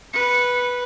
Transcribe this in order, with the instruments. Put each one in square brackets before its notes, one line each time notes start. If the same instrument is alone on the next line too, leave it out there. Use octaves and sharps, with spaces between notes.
[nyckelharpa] B4 [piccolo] C#7